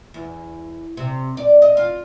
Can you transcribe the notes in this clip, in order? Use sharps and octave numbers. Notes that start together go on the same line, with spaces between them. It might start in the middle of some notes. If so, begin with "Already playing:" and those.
E2
C3
D5
D#5
F4